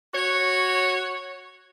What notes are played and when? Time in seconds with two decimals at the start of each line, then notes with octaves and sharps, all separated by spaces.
0.14 F#4 C#5